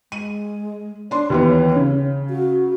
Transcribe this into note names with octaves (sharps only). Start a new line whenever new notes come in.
G#3 D#7
D4 C#5 C6
D#2 E3 B3
C#3
F#4